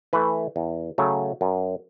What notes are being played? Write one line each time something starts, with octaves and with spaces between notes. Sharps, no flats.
E3 A3 B4
E2
C#3 F#3 A3
F#2